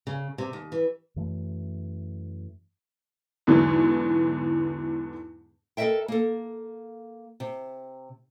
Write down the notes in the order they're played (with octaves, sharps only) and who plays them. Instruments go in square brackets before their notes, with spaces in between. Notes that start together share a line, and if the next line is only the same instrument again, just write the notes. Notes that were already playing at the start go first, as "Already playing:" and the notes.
[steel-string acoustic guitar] C#3
C3
D#2
E3
[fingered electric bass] F#2 E3 A3
[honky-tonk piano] E2 G#2 D3 E3 F#3
[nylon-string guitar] A4 A#4 C5 D#5 E5 G5
A#3 A4
C3